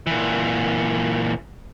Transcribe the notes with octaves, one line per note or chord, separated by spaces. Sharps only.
A#2 E3